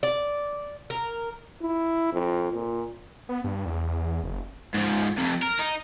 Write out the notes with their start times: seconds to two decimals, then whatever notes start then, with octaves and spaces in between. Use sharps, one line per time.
0.03 D5
0.90 A#4
1.62 E4
2.13 F2
2.53 A#2
3.29 B3
3.44 G2
3.66 E2
4.23 F#1
4.75 G#2 F3
5.18 F2 C3
5.43 A#4
5.60 D#4